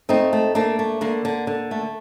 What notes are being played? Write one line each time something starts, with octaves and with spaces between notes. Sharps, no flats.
A3 C4 D#4
A3
A3 A#3 D4
A3
D3 A#3
D3
D3
A3